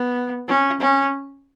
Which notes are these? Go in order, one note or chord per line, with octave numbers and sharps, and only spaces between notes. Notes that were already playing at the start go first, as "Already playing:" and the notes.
Already playing: B3
C#4
C#4